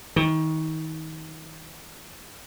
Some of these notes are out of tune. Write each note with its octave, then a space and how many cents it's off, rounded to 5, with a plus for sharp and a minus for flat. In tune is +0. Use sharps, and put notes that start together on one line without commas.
D#3 +30